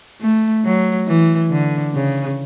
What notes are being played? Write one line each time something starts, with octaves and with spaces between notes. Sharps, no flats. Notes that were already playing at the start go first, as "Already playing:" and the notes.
A3
F#3
E3
D3
C#3